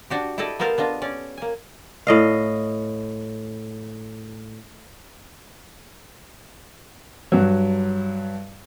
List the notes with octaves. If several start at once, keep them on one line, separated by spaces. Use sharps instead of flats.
D4 F#4 G4
E4 G4 A4 D5 D#5
A#3 B3 A4 A#4 C5 F5
B3 D4 F4 D#5
C#4 D5
A#3 G#5
A2 D#5 F5
G2 F#3